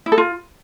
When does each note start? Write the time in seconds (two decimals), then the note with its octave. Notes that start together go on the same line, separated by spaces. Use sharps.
0.06 E4
0.12 A4
0.18 F4